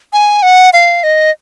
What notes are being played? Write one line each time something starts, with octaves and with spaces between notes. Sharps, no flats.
G#5
F#5
F5
D#5